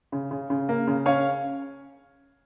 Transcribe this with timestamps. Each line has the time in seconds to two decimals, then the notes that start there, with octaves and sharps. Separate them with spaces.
0.12 C#3
0.31 C#3
0.50 C#3
0.69 A#3
0.87 C#3
1.06 C#4 C#5 F5